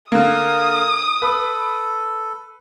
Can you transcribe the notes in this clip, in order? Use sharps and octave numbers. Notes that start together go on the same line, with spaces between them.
D3 A#3 A#4 D#6
A4 B4